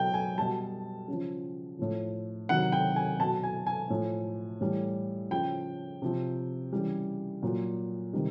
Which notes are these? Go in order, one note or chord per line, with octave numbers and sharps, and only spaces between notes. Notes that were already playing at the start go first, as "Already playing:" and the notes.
Already playing: B2 F#3 G5
G#5
B2 G3 A5
C#3
F3
A2 F3
C3 D#3 F#3 F#5
G5
G#5
B2 F#3 A5
G#5
G#5
A2 F3
A2 E3 G3
C#3 F3 G5
C3 F3
C#3 E3 G3
A#2 F#3
C3 D#3 G3